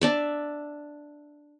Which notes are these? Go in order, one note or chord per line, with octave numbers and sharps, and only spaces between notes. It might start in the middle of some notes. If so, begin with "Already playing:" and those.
D4 D5 E5